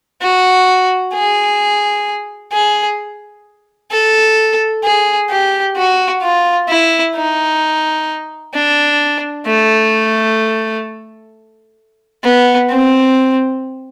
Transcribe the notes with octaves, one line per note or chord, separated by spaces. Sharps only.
F#4
G#4
G#4
A4
G#4
G4
F#4
F4
E4
D#4
D4
A3
B3
C4